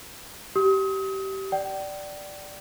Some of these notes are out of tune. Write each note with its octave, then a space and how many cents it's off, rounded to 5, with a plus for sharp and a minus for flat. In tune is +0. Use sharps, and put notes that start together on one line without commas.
G4 -25 D#6 +35
D5 +0 G5 -35